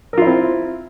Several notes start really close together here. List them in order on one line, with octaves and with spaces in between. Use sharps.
A#4 F4 E4 C4